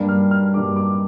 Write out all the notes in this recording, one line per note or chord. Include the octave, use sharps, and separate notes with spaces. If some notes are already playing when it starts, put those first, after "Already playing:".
Already playing: G2 G3 A#3 D4
F6
F6
G2 G3 A#3 D4 D6
D6